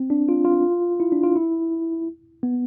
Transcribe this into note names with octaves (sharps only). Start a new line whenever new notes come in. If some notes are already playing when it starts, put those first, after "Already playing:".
Already playing: C4
D4
F4
F4
E4
D4
F4
E4
B3